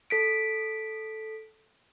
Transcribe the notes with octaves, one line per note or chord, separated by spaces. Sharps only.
A4 B6 D7